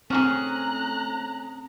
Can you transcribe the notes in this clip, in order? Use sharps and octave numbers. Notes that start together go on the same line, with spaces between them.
A3 C4 C#4 F#4 G#4 A#5 F#6